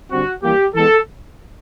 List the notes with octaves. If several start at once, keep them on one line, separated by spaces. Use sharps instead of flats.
D3 G3 C4 F#4
E3 G3 A#3 G4
E3 G#3 B3 A4